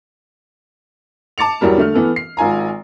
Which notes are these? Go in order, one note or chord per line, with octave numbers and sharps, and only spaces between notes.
A5 D6 A6 C#7 F7
E2 F#3 G3 A#4
D3 A3 F6
E3 B3 A4
C7
G#1 F4 G#5 A#5